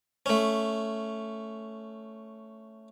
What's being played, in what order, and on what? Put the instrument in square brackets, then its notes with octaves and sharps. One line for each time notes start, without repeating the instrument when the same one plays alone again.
[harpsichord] A3 C#4